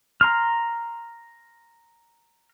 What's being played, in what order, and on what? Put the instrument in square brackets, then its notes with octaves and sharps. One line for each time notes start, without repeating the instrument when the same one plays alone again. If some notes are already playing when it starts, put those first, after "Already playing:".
[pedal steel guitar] A#5 C6 F6